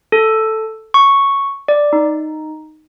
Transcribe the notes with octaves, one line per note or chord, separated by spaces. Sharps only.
A4
C#6
D5
D#4